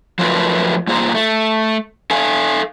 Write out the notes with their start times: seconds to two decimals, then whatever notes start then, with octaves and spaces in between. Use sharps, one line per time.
0.19 F3 F#3 A3 F4 A#4 B4
0.88 G2 A#3 F4 G#4 C5 A#5
1.14 A3
2.11 A4 E5 F5 G#5